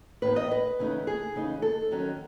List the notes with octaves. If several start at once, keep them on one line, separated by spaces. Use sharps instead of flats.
A2 E3 B3 D#4 B4
D#5
B4
D#2 C#3 E3 A3 D#4
G#4
C#3 E3 A3 D#4
A4
D#2 D#3 F#3 C#4